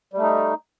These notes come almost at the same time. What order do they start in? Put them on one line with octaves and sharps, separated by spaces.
G3 A3 D#4